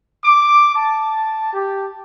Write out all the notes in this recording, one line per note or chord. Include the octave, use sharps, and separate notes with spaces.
D6
A5
G4